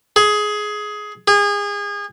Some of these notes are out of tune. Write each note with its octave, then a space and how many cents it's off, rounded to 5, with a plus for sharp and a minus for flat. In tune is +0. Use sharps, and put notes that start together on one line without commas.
G#4 +15
G#4 -30